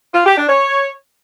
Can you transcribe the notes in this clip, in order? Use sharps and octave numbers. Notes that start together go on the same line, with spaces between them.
F4
G4
D4
C#5